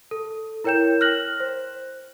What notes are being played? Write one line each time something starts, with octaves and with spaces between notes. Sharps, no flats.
A4
E4 A#4 C#5 G5 G6 E7
F6 F#6 A#6 F#7
C5